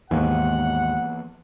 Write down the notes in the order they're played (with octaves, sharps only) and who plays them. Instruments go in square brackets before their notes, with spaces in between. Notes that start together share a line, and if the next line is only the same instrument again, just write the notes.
[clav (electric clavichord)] D#2 G#2 [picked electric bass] E3 A#3 B3 [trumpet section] F#5